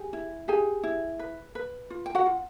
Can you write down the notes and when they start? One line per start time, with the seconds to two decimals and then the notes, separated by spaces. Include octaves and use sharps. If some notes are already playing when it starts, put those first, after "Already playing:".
Already playing: G4 G#4 G#5
0.13 E4
0.48 G4 G#4 G#5
0.84 E4
1.19 B4
1.55 B4
1.90 F4
2.06 G5
2.15 F#4 F#5
2.26 F4